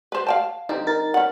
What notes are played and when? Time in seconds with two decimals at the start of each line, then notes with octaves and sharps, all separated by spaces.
0.12 B4 C5
0.27 F5 G5 A5
0.69 D3 G3 C4 D#4
0.86 D#4 A#4 A6
1.14 C#4 F#5